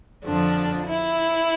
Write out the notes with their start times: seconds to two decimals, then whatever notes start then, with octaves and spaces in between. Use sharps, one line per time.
0.24 F2 D3 F3 D4
0.86 E4